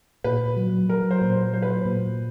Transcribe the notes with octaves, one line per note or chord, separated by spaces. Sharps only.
A#2 B4
F#3
F#3 A#4
C5
A#2
C5
F#3 C5
B4
C5
A#2